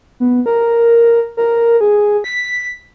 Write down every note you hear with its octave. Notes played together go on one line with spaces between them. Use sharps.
B3
A#4
A#4
G#4
B6